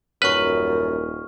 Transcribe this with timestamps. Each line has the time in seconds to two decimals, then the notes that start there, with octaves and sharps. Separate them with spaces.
0.22 D#1 F#2 B4 C#6 F6